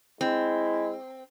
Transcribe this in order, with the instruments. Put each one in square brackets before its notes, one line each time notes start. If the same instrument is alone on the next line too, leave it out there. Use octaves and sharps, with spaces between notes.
[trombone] G#3 [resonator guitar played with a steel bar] C4 [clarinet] E4